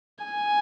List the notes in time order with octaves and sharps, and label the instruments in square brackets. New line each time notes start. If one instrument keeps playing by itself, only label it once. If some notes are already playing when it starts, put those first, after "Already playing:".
[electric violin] G#5